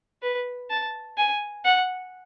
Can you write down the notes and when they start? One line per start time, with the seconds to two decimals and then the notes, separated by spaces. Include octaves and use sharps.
0.22 B4
0.70 A5
1.17 G#5
1.64 F#5